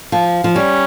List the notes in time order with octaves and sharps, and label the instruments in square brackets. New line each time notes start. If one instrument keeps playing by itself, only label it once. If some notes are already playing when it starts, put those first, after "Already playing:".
[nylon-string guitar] F3
F3
[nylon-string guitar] G3 [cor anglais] C#4